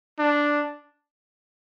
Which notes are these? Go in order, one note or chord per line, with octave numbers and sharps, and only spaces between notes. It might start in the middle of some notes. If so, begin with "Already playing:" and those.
D4